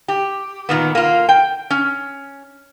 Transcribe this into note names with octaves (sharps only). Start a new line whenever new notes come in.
G4
A#2 D#3 B3
A#3 F4
G5
C#4